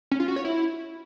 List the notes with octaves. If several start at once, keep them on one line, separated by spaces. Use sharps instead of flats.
C#4
F4
F#4
C#5
E4